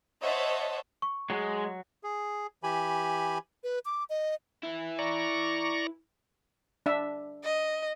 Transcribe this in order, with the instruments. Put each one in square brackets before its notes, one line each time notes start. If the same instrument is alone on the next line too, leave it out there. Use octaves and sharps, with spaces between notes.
[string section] C5 C#5 D#5 E5 F#5 A5
[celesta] C#6
[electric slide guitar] F#3 [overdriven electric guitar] G#3
[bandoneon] G#4
E3 G4 G#5 B5
[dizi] B4
D6
D#5
[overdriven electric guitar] E4 B4
[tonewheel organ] D5 A#5 C#6
[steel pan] D4 E5
[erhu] D#5